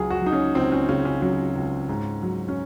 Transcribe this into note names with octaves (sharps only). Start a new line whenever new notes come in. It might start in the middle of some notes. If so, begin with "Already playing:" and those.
Already playing: C#2 C#3 F#3 G#4
F#4
F#3 D#4
C#4
C#2 C4
C#4
C#3 C#4
C#4
F#3 C#4
C#2
G#2
F#3
C#4